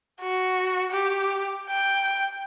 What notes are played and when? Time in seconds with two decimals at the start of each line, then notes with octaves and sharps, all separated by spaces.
0.21 F#4
0.91 G4
1.70 G5